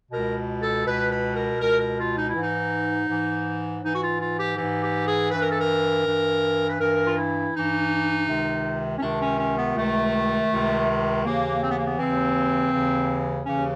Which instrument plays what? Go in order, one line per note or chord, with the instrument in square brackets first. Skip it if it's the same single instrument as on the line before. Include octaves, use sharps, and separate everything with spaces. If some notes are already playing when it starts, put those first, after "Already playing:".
[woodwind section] C#2 B2 A#4
A4
C#2 B2 B4
B4
A#4
C#2 B2 A#4
A#4
F4
D#4
E4
G#2 E3
D#4
G#2 E3
G#2 E3 D#4
F#4
F4
F4
G4
G#2 E3 G4
G4
G#4
G2 E3 B4
A#4
A4
A#4
G2 E3
B4
G2 E3 A#4
F4
E4
G2 E3 D#4
C#2 C3 D#3
C#4
C#2 C3 D#3 D4
C#4
C#4
B3
C#2 C3 D#3 A3
C#2 C3 D#3
D#2 C#3 E3 A#3
C4
B3
A#3
B3
D#2 C#3 E3 C4
D#2 C#3 E3
D#2 C#3 E3 C#4